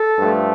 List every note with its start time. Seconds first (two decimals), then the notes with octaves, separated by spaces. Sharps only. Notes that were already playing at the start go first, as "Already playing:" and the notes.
Already playing: A4
0.18 G2 F3 A3